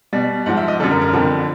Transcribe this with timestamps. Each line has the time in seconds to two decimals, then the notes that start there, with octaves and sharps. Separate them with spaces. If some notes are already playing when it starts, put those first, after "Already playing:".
0.13 B2 G3
0.46 G#2 F3 F#5
0.57 E5
0.68 D#5
0.80 F#2 D3 G3 A4
0.91 A#4
1.01 A#4
1.13 F2 D3 F3